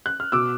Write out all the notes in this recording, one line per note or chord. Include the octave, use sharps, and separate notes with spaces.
F#6
F6
B2 D6 E6